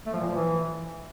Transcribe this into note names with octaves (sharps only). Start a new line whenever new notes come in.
A3
F3
A#2
F3
E3